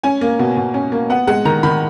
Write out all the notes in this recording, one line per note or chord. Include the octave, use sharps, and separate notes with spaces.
C#4 G#5
A#3
B2
B2
C#4
A#3
B3 F#5
G#3 F#5
D#3 A#5
D#3 B5